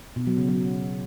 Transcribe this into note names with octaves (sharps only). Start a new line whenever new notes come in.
B2
F#3
C#3
F#3